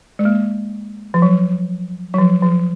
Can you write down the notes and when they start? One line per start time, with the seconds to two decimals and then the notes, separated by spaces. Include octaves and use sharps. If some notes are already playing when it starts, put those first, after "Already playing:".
0.19 G#3
0.25 A#3
1.14 F3
1.22 F#3
2.14 F#3
2.18 F3
2.43 F3